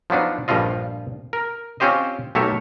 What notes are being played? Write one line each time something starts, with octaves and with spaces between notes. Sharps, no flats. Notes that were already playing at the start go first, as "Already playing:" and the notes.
F3 F#3 B3 D4 D#4
A#1 G2 F3 G3 F4 D#5
A#4
C4 C#4 F4 G4 C5 D#5
B1 A3 G4 A#4 C#5 E5